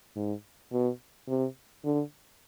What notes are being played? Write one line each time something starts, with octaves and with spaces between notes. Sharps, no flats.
G#2
B2
C3
D3